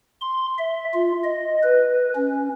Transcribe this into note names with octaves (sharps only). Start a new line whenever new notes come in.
C6
E5
F4
D#5
B4
C#4